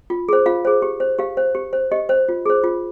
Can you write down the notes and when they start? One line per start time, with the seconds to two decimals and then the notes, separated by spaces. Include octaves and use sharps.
0.10 F4
0.29 G#4 C5
0.46 F4 F5
0.65 G#4 C5
0.82 G4
1.00 C5
1.19 G4 F5
1.37 C5
1.55 G4
1.73 C5
1.91 G4 D#5
2.09 C5
2.29 F4
2.46 G#4 C5
2.64 F4